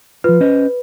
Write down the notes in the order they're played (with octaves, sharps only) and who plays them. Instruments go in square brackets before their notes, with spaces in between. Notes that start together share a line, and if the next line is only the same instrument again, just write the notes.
[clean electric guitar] F3 F4 [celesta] B4
[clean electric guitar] C#4 C5 D#5